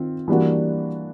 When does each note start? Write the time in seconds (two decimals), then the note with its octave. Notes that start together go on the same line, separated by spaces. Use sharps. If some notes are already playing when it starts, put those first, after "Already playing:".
Already playing: D#3 C4 F4
0.28 E3 G3 A#3 D4 F#4